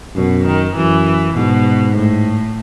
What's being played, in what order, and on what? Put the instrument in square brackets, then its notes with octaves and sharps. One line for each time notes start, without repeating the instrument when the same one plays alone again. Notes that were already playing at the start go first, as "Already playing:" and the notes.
[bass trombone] F#2 [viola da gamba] B2
[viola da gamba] D#3
[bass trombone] F#2 [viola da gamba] E3
[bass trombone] G#2 [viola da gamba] B2
[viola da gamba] A2